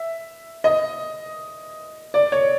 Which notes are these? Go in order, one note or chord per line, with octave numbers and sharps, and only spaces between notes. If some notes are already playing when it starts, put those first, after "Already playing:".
Already playing: E5
D#5
D5
C#5